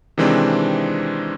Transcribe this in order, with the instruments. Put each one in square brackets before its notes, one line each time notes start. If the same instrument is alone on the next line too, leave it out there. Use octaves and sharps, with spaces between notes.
[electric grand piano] C3 D#3 E3 G#3 C4 D4